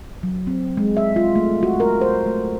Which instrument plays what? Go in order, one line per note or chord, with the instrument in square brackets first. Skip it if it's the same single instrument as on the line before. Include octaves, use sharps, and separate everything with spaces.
[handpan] F#3
C4
G#3
E5
F4
A3
F#4
A#4
C5
A3